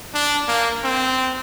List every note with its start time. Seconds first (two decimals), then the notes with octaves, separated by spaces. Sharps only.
0.14 D4
0.48 A#3
0.83 C4